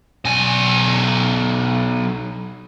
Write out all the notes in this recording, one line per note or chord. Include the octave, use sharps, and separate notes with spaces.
B1 G#5